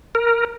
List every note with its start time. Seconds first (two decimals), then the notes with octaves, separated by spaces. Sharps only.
0.15 A#4